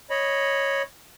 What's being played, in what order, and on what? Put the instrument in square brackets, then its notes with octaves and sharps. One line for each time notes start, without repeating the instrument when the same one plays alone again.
[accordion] C#5 D#5 B5